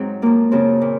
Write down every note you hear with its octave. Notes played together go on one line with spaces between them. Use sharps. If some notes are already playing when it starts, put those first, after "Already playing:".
Already playing: G#2 F#3 C4
F#2 F3 A#3
F#2 C#3 F3 C4
A#2